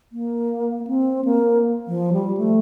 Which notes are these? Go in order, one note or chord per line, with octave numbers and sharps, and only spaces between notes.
A#3
C4
A#3
F3
G3
A3